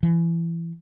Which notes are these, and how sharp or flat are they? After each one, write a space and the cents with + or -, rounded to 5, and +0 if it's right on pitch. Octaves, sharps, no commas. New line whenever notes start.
E3 +25